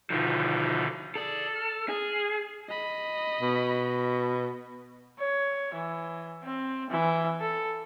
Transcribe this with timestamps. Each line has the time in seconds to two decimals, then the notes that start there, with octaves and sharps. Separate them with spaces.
0.10 B2 D3 D#3 F3 D#4
1.15 G#4 A4 D5
1.55 F6
1.89 G#4
2.69 D#5 B5
3.41 B2
5.19 C#5
5.74 E3
6.43 C4
6.90 E3
7.40 A4